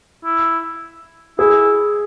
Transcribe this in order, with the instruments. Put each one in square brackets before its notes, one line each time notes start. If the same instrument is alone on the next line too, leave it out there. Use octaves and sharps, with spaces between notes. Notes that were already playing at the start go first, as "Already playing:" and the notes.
[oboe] E4
[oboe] E4 [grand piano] G#4